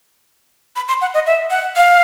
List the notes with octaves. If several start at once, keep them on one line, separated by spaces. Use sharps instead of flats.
B5
C6
F#5
D#5
E5
F#5
F5